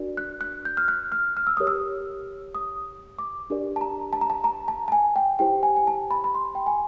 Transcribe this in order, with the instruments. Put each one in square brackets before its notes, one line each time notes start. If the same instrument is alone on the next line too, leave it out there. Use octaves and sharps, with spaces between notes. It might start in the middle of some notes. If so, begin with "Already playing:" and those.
Already playing: [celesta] D4 F#4 A#4 D5
F#6
F#6
G6
F6
F#6
F6
F6
E6
G4 A#4 C#5 D#6
E6
D#6
D6
D4 G4 A#4 D5
A5
A#5
A5
A#5
A5
A#5
A5
A5
G#5
G5
E4 G4 C5 G5
G#5
G#5
A5
B5
B5
C6
G5
G#5